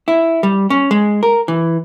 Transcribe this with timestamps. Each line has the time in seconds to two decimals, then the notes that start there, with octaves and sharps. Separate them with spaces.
0.08 E4
0.43 G3
0.70 C#4
0.91 G#3
1.23 A#4
1.48 E3